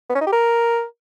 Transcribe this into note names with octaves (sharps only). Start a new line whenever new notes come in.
B3
C#4
D#4
G4
A#4